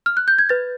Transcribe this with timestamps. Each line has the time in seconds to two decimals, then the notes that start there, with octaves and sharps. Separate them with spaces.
0.06 F6
0.17 F#6
0.28 G6
0.39 G#6
0.49 B4 A6